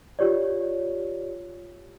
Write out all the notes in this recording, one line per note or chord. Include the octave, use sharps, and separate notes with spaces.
F4 G4 C#5 D5